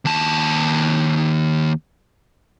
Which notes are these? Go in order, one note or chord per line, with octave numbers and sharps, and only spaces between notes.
D#2 A5